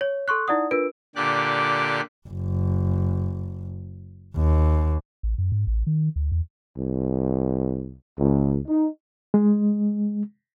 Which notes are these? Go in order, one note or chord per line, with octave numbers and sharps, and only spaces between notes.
C#5
A4 C6 C#6 F#6
D#4 E4 D5 F#5 D#6
D4 F4 A#4 B4 E6 D7
A#2 D3 G4 D5 F#6
F#1
D#2
A1
F#2
G#2
A1
D#3
D2
E2
C2
C#2
D#4
G#3